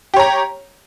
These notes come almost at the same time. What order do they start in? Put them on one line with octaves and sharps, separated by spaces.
G4 C#5 A#5